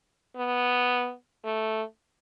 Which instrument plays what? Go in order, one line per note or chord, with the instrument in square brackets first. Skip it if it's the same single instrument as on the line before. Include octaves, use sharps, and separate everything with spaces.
[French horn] B3
A3